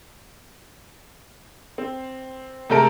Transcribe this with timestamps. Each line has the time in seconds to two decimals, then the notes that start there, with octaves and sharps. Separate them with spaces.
1.78 C4
2.70 C3 G#3 A3 A4 A#4 D7